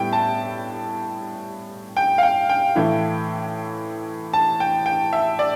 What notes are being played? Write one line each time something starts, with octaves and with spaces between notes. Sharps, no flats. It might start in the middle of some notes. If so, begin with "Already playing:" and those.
Already playing: A2 G3 B3 E4 G5
A5
G5
F5
G5
G5
A2 E3 A3 E4
A5
G5
G5
E5
D5